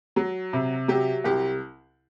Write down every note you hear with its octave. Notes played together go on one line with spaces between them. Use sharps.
F#3
C3
F#3 G4
C2 G4